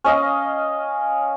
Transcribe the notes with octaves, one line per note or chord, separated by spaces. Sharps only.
C#4 D#5 F5